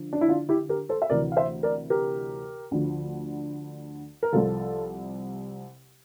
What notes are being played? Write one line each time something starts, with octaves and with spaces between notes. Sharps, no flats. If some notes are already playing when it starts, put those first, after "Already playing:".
Already playing: D3 F3
D4
E4
D4 F4
E4 G4
G4 A#4
A4 C5
E5
D2 C3 E3 A#4 D5
F5
C5 E5
A#4 D5
G4 A#4
D2 D3 F3
A#4
C2 C3 F3 F4 A4